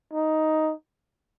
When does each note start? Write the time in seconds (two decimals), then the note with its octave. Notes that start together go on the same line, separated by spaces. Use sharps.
0.13 D#4